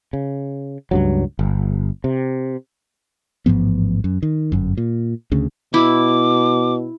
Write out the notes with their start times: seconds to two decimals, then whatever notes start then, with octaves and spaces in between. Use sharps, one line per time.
0.13 C#3
0.91 C#2 G2 F#3
1.39 G1
2.04 C3
3.46 A1 G#2 F3 B3
4.04 F#2
4.22 D#3
4.52 G1 F#2
4.77 A#2
5.32 D2 C#3
5.74 B2 E4 D6